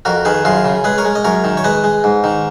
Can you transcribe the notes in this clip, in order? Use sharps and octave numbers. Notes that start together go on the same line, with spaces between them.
F2 F#4 A#4
D#3 G#4 B4
F#2 F4 G#4
C#3
G#3 G#4 B4
A#4 C#5
G#3
D#5
F#2 A#4 C#5
D#3
C#5
G#3 B4 D#5
G#3
G#2
D#3